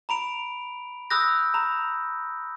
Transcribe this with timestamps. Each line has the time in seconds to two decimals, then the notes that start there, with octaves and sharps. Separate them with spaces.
0.09 A#5 B5 D7 F7
1.10 B5 D#6 E6 F#6 G6 A#6
1.54 A#5 B5